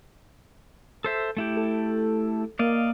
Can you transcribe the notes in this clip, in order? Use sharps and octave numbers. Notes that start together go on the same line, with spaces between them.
A4 C5 E5
A3 E4 G4
A4
A#3 D5 D#5 F5